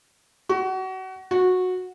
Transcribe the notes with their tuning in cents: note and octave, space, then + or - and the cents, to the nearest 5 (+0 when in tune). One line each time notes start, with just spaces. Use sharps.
F#4 +30
F#4 -15